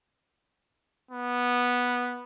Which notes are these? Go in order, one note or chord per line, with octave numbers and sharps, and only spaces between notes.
B3